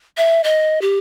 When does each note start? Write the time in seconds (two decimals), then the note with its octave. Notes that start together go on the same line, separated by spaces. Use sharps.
0.17 E5
0.44 D#5
0.82 G4